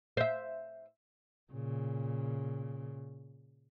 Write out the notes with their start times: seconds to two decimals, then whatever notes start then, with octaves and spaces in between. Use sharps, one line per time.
0.17 C5 E5
1.52 A#2 C#3